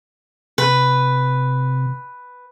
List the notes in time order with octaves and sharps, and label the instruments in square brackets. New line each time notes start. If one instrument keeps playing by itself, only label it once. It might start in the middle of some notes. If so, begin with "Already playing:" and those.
[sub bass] C3 [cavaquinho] B4